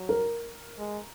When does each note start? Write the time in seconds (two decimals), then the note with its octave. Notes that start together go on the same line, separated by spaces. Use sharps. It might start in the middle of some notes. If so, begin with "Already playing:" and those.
Already playing: F#3
0.09 A#4
0.79 G#3